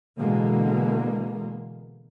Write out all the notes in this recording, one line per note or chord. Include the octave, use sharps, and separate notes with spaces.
B2 D3 E3 G#3 A#3